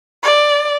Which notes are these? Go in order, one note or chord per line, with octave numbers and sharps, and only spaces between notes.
D5